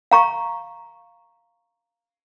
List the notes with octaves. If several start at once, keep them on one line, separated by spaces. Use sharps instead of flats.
F5 A#5 C#6